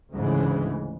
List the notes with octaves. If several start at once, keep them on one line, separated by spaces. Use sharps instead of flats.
D2 G#2 C#3 E3 G#3